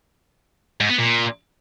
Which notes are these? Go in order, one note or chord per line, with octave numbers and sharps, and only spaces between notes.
G#2
B3
A#2